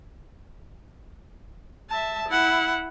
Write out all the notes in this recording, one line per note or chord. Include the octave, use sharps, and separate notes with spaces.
E5 A5
E4 F#5